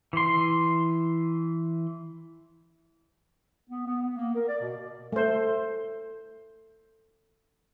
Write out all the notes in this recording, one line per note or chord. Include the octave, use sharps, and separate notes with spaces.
E3 C6
B3
B3
B3
A#3
A#4
D5
B2
A3 C5